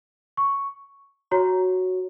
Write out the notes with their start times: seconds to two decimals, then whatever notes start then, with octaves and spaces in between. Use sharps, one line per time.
0.37 C#6
1.31 F#4 C#5 A#5